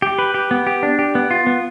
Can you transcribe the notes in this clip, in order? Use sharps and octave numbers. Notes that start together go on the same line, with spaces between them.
G4
B4
G4
B3
G4
D4
G4
B3
F4
B3